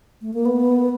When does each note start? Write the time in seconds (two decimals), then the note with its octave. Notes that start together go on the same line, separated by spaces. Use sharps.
0.21 A3
0.34 A#3
0.45 B3